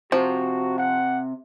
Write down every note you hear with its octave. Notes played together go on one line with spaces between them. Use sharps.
C3 F3 F#4
F#5